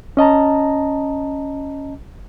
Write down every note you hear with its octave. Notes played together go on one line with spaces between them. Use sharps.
C#4 D#5 A5 A#5